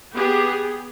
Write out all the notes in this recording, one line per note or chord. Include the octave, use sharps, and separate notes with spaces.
B3 G4 G#4